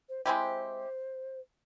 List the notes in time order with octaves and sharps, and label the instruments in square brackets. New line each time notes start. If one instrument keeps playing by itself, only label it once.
[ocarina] C5
[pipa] G#3 C4 E4 G4 [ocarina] C5